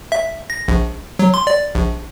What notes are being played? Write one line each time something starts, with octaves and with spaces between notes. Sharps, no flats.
E5
A#6
A#1
F#3
C6
D5
A#1